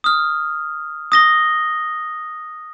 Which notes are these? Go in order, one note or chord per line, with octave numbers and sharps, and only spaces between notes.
D#6 F6
D#6 A#6 G7